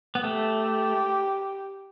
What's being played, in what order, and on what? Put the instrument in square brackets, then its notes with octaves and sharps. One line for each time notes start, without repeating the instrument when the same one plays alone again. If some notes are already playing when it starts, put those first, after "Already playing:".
[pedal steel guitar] B3
[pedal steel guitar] A3 [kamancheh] G4